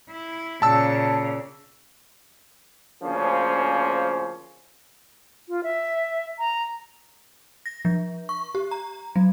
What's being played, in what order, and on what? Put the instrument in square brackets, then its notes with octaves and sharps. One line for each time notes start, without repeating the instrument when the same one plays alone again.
[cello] E4
[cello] A#2 C#3 [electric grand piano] A5 E6
[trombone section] D2 C#3 F3 A#3 C#4 C5
[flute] F4
E5
A#5
[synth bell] A#6
F3
C#6
G4
A#5
F#3